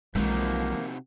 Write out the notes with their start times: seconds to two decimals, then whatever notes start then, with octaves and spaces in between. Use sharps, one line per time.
0.15 B1 C3 E3 F3 G#3 A#3 D#4 F#4